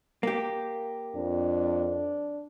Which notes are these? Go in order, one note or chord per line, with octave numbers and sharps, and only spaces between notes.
A#3 G4
F2 D4